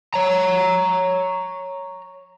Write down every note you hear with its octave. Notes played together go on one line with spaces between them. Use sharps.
C#5 A#5